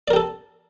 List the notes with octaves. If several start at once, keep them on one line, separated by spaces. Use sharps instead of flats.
G4 A4 A#4 D5